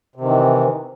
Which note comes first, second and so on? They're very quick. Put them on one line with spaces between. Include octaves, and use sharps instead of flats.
C3 D#3 E3